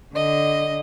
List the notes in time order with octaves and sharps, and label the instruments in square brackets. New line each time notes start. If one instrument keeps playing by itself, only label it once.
[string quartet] D3 D#5